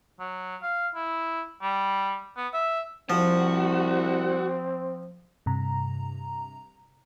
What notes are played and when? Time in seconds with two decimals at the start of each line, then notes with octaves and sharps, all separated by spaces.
0.19 F#3
0.62 F5
0.95 E4
1.62 G3
2.37 B3
2.53 E5
3.10 C2 F3 C4 F#4
5.46 G2 C3 A#5